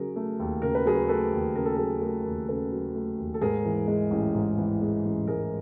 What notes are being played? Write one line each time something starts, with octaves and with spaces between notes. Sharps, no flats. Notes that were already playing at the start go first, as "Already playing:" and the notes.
Already playing: C#3 F#3 G#4 A#4
A3
D#2
C#3 A#4
B4
F#3 G#4 A#4
A3 A4 B4
D#2
C#3 A#4
A4
F#3 G#4 A#4
A3 G#4 A#4
D#2
C#3 A4 B4
F#3
A3
D#2
A4
G#2 G#4 A#4
E3
G#3
A1
G#2
E3
G#3
A1
G#2 G#4 A#4